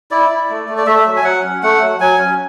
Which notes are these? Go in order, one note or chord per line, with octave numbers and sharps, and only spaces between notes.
E4 D5
E4
A3
A3
D5
A3 E5
F#3
G#5
F#3 F#5
C#4
A3 F#5
F#3
F#3 G#5
C#4